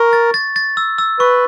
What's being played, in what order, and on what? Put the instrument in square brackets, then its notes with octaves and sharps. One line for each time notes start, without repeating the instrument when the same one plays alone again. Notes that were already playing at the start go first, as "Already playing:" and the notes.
Already playing: [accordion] A#4 [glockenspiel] C#6
[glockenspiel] A6
A6
A6
E6
E6
[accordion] B4 [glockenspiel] C#6